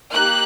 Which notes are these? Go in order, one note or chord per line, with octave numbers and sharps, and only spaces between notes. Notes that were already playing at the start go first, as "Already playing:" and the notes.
A#3 D#4 G4 F#6